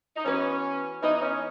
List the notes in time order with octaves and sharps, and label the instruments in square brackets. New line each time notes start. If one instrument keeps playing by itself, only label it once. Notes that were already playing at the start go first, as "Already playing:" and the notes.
[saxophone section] D#4
[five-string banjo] E3 B3 F#4 B4 [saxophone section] C#4
[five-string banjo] E3 B3 E4 B4 D#5 [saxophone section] D#4
[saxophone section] D#4
C#4